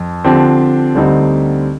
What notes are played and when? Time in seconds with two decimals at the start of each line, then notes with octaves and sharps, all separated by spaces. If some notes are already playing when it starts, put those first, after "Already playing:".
Already playing: F2
0.24 D3 F3 C4 G4
0.95 D2 D3 G3 C4 D#4